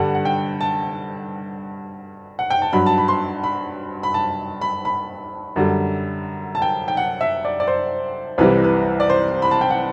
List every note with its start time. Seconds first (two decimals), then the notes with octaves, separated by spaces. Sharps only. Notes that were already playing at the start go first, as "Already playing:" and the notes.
Already playing: G2 D3 G3 F#5
0.15 F#5
0.25 G5
0.61 A5
2.39 F#5
2.50 G5
2.62 A5
2.73 G2 F#3 B5
2.86 A5
2.98 B5
3.08 C6
3.44 B5
4.03 B5
4.14 A5
4.61 B5
4.85 B5
5.56 F#2 D3 G3
6.55 A5
6.62 G5
6.88 G5
6.97 F#5
7.21 E5
7.45 D5
7.60 D5
7.68 C5
8.38 C2 C3 E3 G3 B4
8.64 B4
9.00 D5
9.10 C5
9.42 B5
9.51 A5
9.61 G5
9.70 F#5